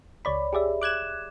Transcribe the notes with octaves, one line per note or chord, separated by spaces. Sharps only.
C#2 C#5 D5 B5
G4 G#4 D5 E5
D6 F#6 G#6 E7